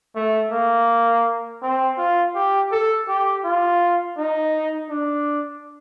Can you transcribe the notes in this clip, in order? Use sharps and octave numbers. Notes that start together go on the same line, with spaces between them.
A3
A#3
C4
F4
G4
A4
G4
F4
D#4
D4